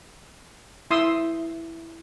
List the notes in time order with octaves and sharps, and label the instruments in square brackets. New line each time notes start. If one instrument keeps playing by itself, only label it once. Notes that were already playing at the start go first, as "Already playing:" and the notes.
[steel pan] E4 C6 D#6 E6